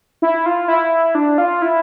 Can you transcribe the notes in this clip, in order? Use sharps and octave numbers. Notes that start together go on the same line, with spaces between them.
E4
F4
E4
D4
F4
E4